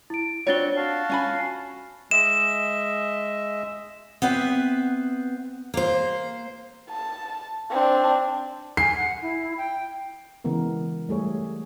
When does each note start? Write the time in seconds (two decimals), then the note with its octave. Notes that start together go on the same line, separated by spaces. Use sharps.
0.10 E4 D7
0.47 C4 D4 F4 F#4 C#5 A6 G7
0.76 F#4 F5 A5
1.09 C#4 G#5 B5
2.11 G#3 D#5 E5 E7
4.22 B3 C4 B4 E5
5.74 A#3 C5
6.89 A5
7.70 C4 D4
8.77 G#5 C7
8.96 F#5
9.22 E4
9.57 G5
10.44 C#3 E3 G#3 B3 A#4
11.09 G3 A3 G#4 C#5